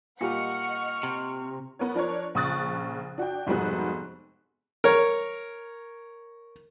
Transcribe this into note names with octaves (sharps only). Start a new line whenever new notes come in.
A#2 G3 D#5 F#5 C#6 F6 C#7
C3
B3 A#4 C#5
F3 D4 A#4 C#5
A#1 C#3 C#6 D#6 F#6 A6
D4 F#4 D5 G5
F1 G#2 B2 G3 B3 F#6
A#4 C#5